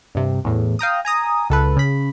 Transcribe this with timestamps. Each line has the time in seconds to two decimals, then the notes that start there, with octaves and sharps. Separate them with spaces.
0.15 G2 C3
0.44 E2 A2
0.79 F5 G5 A#5 D#6
1.05 G#5 A#5 D#6
1.50 C#2 A4 B4
1.77 C#3 B5